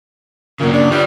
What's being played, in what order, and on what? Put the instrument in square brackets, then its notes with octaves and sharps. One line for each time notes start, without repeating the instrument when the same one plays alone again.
[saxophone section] F#2 A#2 [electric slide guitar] C#3 A#3
[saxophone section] D4
[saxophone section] E3 G3 [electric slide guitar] F4 C#5